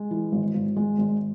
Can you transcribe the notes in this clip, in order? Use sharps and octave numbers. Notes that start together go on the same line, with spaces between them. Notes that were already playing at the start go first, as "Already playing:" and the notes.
Already playing: G#3
E3
G#1
G#1
G#3
G#1